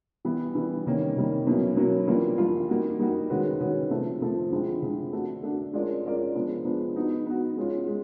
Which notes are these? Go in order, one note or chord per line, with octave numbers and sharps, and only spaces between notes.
E3 G3 B3
E3 G3 B3
C3 D#3 G3 A#3 C#4
C3 D#3 G3 A#3 C#4
B2 F#3 A#3 C#4 E4
B2 F#3 A#3 C#4 E4
E3 G3 A#3 D4 F4
E3 G3 A#3 D4 F4
G3 A#3 D#4 F#4
G3 A#3 D#4 F#4
D#3 G#3 C#4 F#4 B4
D#3 G#3 C#4 F#4 B4
C3 F3 A3
C3 F3 A3
D3 F3 G#3 C4 E4
D3 F3 G#3 C4 E4
A3 D4 F#4
A3 D4 F#4
G#3 C#4 F4 A#4 D5
G#3 C#4 F4 A#4 D5
F3 G#3 B3 D4
F3 G#3 B3 D4
B3 D#4 F#4
B3 D#4 F#4
G#3 C#4 F4
G#3